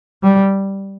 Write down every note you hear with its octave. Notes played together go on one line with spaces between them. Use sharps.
G3